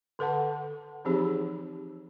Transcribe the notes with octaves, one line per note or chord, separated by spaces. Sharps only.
D3 A4 B4 F#5 A5
E3 F3 C4 D#4 G4 G#4